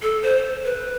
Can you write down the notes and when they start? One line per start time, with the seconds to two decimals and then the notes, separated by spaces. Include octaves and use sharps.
0.02 A4
0.23 C5
0.65 B4